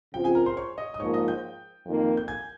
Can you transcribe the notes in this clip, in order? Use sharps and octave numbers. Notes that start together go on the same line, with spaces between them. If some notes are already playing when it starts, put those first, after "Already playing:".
C#3 F3 C4 F4 G5
G#4 G#5
A#4 A#5
C5 C6
C#5 C#6
D#5 D#6
D#6
G#2 F3 A#3 C#5 C#6
D#5 D#6
G5 G6
F2 D#3 A#3
G6
G#5 G#6